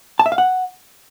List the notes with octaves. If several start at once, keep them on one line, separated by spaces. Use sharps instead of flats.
A5
E5
F5
F#5